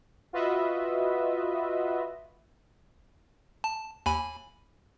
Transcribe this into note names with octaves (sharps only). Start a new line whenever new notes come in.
F4 F#4 B4 D#5 E5
A5
D#2 G#5 B5